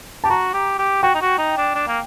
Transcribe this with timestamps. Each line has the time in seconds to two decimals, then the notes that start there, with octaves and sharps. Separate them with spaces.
0.24 G4 A5
0.30 F#4 A#5
0.54 G4
0.79 G4
1.03 F#4 G5
1.15 D#4
1.21 F#4
1.38 D#4
1.58 D4
1.75 D4
1.88 A#3